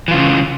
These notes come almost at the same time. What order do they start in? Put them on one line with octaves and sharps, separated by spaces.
E3 F4 C#3